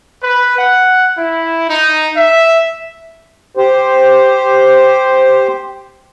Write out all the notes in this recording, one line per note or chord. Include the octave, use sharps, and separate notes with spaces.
B4
F#5
E4
D#4
E5
G4 C5